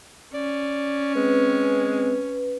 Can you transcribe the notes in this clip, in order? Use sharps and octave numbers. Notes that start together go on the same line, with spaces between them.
C#4 D5
G#3 C4 B4